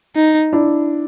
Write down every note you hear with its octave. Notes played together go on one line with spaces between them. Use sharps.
D#4
D4 E4